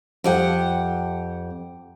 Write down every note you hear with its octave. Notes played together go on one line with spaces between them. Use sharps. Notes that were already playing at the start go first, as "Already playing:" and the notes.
F2 G4 F#5